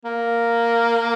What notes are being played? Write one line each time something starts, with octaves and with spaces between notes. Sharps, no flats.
A#3